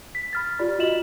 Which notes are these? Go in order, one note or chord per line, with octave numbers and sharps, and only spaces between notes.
B6
B5 F6 A6
F4 G4 D5 B5
F4 F#4 D#5 E7 F#7